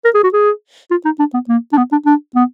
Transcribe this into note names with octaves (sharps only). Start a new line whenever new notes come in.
A#4
G#4
F#4
G#4
F4
D#4
D4
B3
A#3
D4
B3
D4
D4
B3